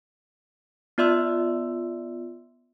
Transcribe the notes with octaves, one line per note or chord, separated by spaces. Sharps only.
B3 F4 D5 E5 C6 E6